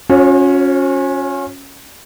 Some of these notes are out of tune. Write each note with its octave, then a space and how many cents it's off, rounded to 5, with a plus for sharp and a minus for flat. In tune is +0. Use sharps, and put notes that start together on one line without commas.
C#4 +0 F#4 -45 C#5 -45